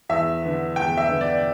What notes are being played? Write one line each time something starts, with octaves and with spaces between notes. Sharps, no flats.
E2 E5
D3 B3
E2 G5
E5
D3 B3
D5